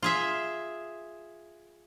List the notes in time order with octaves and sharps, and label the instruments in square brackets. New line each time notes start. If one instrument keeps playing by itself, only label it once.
[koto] F4 G#4 E5